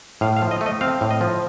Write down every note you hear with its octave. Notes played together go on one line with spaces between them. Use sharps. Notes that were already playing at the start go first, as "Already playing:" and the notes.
A2 F5
F5
F3
D#5
A3
D#5
C4 F5
A2
D#5
F3